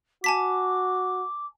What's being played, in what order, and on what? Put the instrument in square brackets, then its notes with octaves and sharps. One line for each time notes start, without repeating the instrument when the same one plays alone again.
[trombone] F#4 [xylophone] G#5 A5 B6 [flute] D6